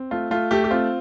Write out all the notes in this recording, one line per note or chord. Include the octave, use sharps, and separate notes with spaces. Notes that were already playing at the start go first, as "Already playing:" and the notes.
Already playing: C4
A3 F4
A3 F4
A3 G4
G4
C4 F4